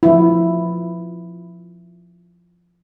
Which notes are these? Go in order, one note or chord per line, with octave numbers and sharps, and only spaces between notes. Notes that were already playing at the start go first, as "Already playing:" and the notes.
F3 E4